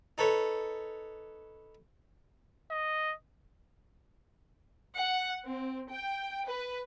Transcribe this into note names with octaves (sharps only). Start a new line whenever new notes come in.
D#4 A4 B4 C#5
D#5
F#5
C4
G5
B4